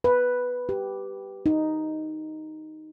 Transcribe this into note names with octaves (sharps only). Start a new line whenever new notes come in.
B4
G4
D#4